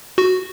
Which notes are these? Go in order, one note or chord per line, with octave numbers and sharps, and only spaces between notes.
F#4